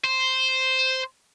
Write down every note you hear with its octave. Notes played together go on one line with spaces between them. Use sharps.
C5